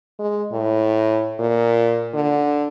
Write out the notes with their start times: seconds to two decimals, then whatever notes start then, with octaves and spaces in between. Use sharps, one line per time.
0.20 G#3
0.53 A2
1.39 A#2
2.14 D3